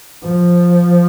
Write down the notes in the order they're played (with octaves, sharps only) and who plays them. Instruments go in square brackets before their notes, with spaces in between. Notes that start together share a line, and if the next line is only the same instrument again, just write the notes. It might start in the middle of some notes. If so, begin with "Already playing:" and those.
[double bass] F3